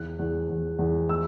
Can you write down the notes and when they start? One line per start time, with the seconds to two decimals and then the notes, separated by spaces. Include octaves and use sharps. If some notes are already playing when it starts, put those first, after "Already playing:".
Already playing: E2 F#6
0.19 E2
0.49 E2
0.79 E2
1.09 E6